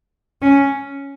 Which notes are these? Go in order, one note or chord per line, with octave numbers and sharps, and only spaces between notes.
C#4